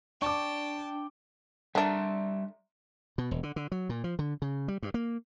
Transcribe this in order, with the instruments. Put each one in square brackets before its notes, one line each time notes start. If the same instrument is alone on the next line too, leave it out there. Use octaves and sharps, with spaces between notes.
[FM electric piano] D4 [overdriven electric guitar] G5 [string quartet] A5 [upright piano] C#6 D6
[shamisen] D3 D4 [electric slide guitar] G3 E5 A#5
[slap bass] B2
E1
D3
D3
F#3
A#2
F3
D3
C#3
G3
G2
A#3